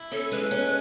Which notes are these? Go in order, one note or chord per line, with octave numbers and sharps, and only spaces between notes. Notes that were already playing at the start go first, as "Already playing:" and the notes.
Already playing: E4
C#4 A4
G#3 B4
C#4